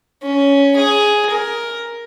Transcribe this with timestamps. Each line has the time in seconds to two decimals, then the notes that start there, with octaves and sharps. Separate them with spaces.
0.22 C#4
0.76 G#4
1.30 A#4